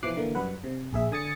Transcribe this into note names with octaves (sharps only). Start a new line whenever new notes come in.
B2 E3 F3 D6 F#6 C7
D3 E3 A#3
F#2 G3 B4 F#5
C3
A#1 G#4 E5
D3 G#5 D#6 A6 C#7